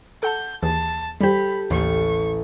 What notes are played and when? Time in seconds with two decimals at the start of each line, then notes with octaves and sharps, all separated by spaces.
0.23 A4 F#5 A5 G6
0.63 D#2 E3 G#4 A5
1.21 G3 G4 A4 C5 B5
1.71 A1 D#2 C#6